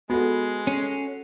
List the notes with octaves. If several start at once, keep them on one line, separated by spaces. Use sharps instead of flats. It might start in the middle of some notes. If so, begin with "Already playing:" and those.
G#3 B3 F#4 A4
C#4 C7